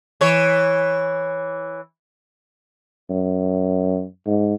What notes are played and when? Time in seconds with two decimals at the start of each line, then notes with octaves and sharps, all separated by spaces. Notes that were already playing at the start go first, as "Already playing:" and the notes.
0.21 E3 C#5
3.10 F#2
4.27 G#2